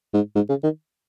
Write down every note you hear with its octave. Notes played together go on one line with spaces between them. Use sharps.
G#2
G#2
C#3
D#3